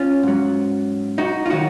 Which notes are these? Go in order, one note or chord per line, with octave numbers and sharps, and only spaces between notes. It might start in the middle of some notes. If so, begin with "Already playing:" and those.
Already playing: C#4 F4
G#2 F#3
D#4 F#4
F4
D#3 F#3 D#4 F#4